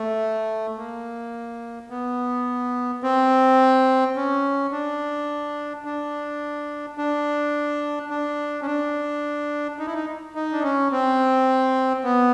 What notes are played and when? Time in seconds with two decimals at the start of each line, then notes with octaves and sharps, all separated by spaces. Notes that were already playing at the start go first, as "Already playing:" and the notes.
Already playing: A3
0.78 A#3
1.90 B3
3.03 C4
4.16 C#4
4.72 D4
5.85 D4
6.98 D4
8.10 D4
8.62 C#4
8.66 D4
9.79 D#4
9.86 E4
9.94 D#4
10.35 D#4
10.52 D4
10.63 C#4
10.91 C4
12.04 B3